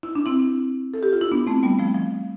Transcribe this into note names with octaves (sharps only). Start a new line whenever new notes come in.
E4
D4
C4 E4
A4
G4
F4
E4
B3 D4
A3 C4
G3 B3
F3 A3
F3